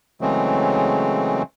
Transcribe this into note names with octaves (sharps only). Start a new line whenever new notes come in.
C#3 E3 F#3 G#3 A3 C4